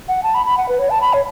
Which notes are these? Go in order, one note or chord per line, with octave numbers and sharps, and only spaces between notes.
F#5
A5
B5
B5
F#5
B4
C#5
A5
B5
C#5